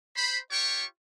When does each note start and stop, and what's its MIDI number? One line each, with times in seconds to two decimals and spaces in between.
0.17 0.38 72
0.17 0.38 83
0.51 0.84 65
0.51 0.84 67
0.51 0.84 73
0.51 0.84 79
0.51 0.84 85